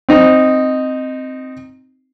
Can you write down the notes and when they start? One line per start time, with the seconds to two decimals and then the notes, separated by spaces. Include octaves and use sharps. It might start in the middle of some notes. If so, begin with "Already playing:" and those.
0.09 C4 D#4